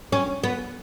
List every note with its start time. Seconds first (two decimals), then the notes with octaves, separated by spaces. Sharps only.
0.12 C#4
0.43 B3